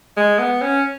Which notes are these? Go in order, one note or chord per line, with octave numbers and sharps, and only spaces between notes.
G#3
B3
C#4